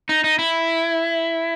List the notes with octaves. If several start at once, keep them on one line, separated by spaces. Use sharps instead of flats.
D#4
D#4
E4